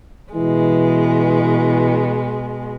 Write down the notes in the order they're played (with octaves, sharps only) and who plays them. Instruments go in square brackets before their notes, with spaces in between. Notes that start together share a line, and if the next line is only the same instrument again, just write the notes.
[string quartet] B2 G#3 [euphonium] E3